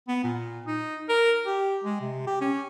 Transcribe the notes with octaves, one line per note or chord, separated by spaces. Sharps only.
B3
A#2
D#4
A#4
G4
G#3
C3
G4
C#4